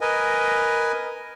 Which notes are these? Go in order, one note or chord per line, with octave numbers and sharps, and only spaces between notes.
A#4 B4 D#5 G#5